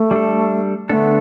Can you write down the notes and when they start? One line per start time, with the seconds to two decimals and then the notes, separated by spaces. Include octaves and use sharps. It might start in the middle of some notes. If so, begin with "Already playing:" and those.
Already playing: A3
0.11 G3 D4 A4
0.89 D3 A3 B3 D4 A4